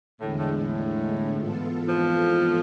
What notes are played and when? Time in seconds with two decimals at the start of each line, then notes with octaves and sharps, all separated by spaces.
0.20 E2 A2 D3 G#3
0.39 A2
0.58 A2
1.33 G#2 E3 B3 F4 A4
1.89 F2 F3